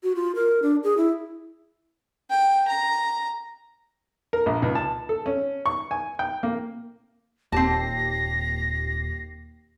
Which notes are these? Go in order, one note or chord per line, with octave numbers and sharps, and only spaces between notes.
F#4
F4
A#4
D4
G#4
E4
G5
A#5
A#4
A#1
C#2
A5
A4
C#4
C#6
G#5
G5
A#3
D#1 D#2 C4 G4 A5 A#6 C7